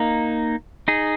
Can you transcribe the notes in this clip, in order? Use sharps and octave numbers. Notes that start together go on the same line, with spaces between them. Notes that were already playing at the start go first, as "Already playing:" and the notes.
Already playing: A#3 D#4
D#4 G#4